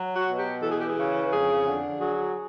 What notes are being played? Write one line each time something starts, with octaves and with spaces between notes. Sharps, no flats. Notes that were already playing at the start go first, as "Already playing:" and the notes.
Already playing: F#3
F#4
B2
G4
E3 A4
G#4
G4
G#4
C#3
F2 G#4
D3
F#3 G#4